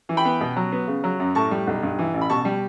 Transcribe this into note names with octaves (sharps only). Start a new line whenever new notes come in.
E3
G5 B5
B3
B2
F#3
B3
C#3
F#3
F#2
A2 A5 C#6
G3
B1
G2
E3
A1
B5
B2 A5 C#6
G3